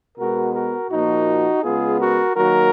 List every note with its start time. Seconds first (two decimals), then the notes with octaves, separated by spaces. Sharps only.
0.18 B2 G#3 B3 F#4 A#4
0.54 F#4 A#4
0.90 A#2 F3 A#3 D#4 F#4
1.63 C#3 G#3 B3 F4 G#4
2.00 F#4 A#4
2.36 D#3 F#3 A#3 F#4 A#4